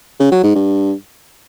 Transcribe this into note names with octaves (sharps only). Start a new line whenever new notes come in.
C#3
F#3
G#2
G2